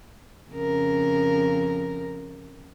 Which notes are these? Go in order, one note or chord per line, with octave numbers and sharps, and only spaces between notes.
F2 C#3 A#4